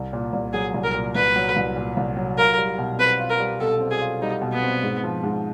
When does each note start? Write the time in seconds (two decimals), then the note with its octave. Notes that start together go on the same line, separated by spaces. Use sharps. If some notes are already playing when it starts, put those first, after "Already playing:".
Already playing: C2
0.13 A#2
0.33 C2
0.53 F#3 G#4
0.74 C2
0.84 A#4
0.94 A#2
1.15 C2 B4
1.36 F#3
1.56 C2
1.76 A#2
1.97 C2
2.17 F#3
2.37 F4 A#4
2.58 G3
2.78 B2
2.98 C4 B4
3.19 F4
3.30 A#4
3.40 G3
3.60 B2 A4
3.80 C4
3.91 G#4
4.00 F4
4.22 G3 D#4
4.41 B2
4.52 B3
4.62 C4
4.82 G#2
5.04 F3
5.23 G#2